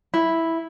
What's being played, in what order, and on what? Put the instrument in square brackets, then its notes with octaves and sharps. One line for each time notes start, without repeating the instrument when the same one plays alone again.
[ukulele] E4